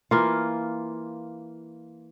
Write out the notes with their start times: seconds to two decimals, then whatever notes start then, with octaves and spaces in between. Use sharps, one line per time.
0.11 E3 A#3 F4